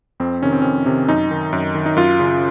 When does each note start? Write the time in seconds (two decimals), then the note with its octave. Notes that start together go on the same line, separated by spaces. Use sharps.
0.20 F2 C4
0.42 C3 D#3 C#4
0.52 C4
0.62 F2 C#4
0.86 C3 D#3
1.08 F#2 D#4
1.31 D#3
1.53 F#2
1.75 D#3
1.86 D#4
1.97 F#2 F4
2.20 C#3